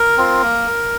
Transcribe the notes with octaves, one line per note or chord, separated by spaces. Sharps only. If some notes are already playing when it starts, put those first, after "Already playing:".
Already playing: A#4
C4 F4
A#3